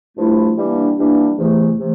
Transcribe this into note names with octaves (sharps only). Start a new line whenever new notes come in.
G2 F3 A3 E4
E3 G3 A#3 D4
E3 G3 A#3 D4
E2 C3 E3 A3
C3 E3 A3